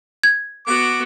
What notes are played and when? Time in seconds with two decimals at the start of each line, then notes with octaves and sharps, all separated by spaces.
0.23 G#6
0.67 B3 F#4 D6